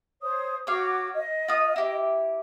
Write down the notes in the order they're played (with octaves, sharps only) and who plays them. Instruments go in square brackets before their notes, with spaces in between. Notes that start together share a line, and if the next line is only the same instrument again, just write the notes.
[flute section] C5 C#5 D#6
[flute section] F#4 D6 [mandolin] C#5 F5
[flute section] D#5
[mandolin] F4 D#6
E4 G4